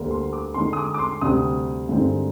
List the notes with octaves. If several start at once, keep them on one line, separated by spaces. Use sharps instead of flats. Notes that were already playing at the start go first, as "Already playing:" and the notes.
Already playing: D2 D3 G3 A#3
C6
D6
D3 G#3 D#4 C6
D#6
D6
D6
C6
D2 C3 G3 D#6
G2 D3 G#3 C4 D#4